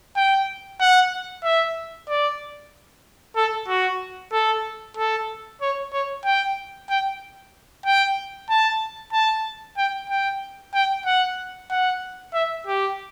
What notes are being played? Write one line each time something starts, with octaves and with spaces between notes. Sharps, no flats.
G5
F#5
E5
D5
A4
F#4
A4
A4
C#5
C#5
G5
G5
G5
A5
A5
G5
G5
G5
F#5
F#5
E5
G4